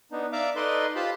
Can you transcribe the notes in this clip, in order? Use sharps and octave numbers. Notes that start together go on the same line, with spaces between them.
B3 D4 D#4
D5 E5 F5 A#5 D6
D#4 A4 B4 D5 D#5 C6
F4 G4 C5 A5 B5